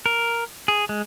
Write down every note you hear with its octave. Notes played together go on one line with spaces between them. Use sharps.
A#4
G#4
G#3